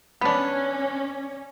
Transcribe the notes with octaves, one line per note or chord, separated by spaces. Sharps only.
B3 C#4 D4